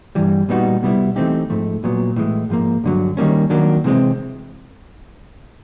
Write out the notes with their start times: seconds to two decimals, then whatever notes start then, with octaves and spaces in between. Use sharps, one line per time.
0.15 G2 E3 G3
0.49 A#2 G3 B3 D#4 F#4
0.82 C2 B2 G3 B3 E4
1.16 E3 A3 C4 D#4 G4
1.50 G#2 F3 A3
1.83 B1 A#2 F#3 B3
2.16 A2 E3 G#3
2.50 G#2 F3 A#3
2.84 G2 D3 F#3
3.17 D#3 G3 A#3 C#4
3.50 D#3 F#3 A#3 D4
3.84 C3 E3 G#3 C4